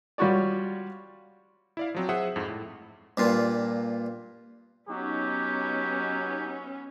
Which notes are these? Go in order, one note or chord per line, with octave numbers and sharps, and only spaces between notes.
G3 F4 F#4 C#5 D5
E4 D5 F5
F3 F#3 C4
G#4 C5 E5 F#5 D#6
F2 G#2
A2
G2 A#2 F4
F#3 B3 C#4 D#4 G4